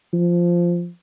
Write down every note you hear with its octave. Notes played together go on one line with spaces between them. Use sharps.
F3